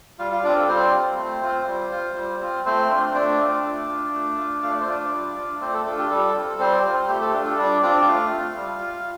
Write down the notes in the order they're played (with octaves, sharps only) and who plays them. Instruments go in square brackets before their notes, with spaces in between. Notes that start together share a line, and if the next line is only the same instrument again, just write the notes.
[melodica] G3 F4 F5
F4 F5
C4 D4 F4 D5
A4
G3 C4 C5
F4
A3
C4 F4
G3
F4
G3
C4 F4
A3 C4 C5
D4 F4
A3 D4 D5
C4 F4
A3
F4
A3
F4
A3 F5
D5
C5
D4 F4 D5
G3
D4 F4
A3 C4 C5
A4
D4 F4 A4
G4
G3 A4
C4 F4
G3 C4 C5
C4 F4
A3 G4
A4
D4 F4 G4
A4
G3 D4 D5
C4 D4 F4 D5
A3 F4 F5
F4
G3
F4